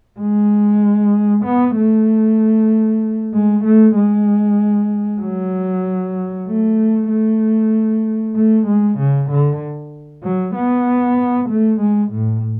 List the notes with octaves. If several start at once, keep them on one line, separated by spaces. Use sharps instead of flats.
G#3
B3
A3
G#3
A3
G#3
F#3
A3
A3
A3
G#3
C#3
D3
F#3
B3
A3
G#3
A2